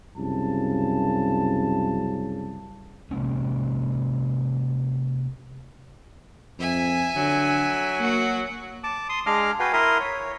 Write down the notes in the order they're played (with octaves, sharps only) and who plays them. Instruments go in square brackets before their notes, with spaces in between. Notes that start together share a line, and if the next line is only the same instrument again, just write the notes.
[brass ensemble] C2 F#2 C#3 A5
[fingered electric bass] C3 G#3 A#3 C#4
[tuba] F2 [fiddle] E5 G#5
[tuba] D3 [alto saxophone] F#3
[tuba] A#3 [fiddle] F#4
[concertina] A5 D6
C6 D#6
G#3 D4 D#5 F5 D6 F6
F#4 B4 F5 G5 G#5
E4 A#4 E5 A#5 C6 D#6
C#5